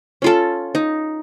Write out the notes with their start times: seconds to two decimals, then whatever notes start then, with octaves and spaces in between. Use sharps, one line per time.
0.22 C#4 F4 A4
0.75 D#4